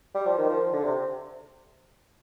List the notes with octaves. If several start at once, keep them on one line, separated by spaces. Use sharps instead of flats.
G3
F3
D#3
F3
D3
C3